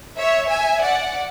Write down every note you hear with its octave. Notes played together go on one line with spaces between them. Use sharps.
C#5 E5
E5 G#5
D5 F#5